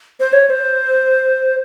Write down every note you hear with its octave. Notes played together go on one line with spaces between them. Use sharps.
C5
C#5
C#5
C5